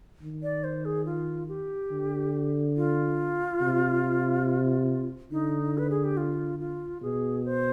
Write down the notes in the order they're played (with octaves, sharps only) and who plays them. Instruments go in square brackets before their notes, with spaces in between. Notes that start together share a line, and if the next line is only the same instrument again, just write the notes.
[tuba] D#3
[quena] D5
C5
G#4
F4
G4
[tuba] D3
[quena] F4
[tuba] C3
[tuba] D3 [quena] D#4
[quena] B4
G#4
G4
F4
F4
[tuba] B2 [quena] G#4
[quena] C5